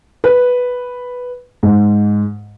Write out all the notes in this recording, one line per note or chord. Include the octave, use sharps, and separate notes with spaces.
B4
G#2